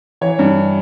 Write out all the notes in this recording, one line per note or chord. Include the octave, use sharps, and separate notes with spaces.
E3 C#5
G2